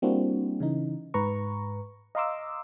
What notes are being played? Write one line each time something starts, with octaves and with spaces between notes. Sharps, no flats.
G3 A#3 C4 D4 E4 F#4
C#3 E3 D#4
G#2 B4 A#5 C#6
D#5 F5 A#5 C6 D6 E6